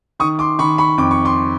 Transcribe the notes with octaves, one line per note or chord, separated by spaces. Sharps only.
D#3 C#6 D#6
C6 D6
D#3 B5 C#6
B5 C#6
F2 D6
C#6
C6 D6